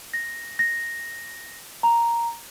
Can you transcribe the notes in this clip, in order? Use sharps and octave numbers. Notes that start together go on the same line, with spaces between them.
A#6
A#6
A#5